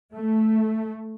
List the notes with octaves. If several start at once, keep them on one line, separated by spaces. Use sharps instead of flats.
A3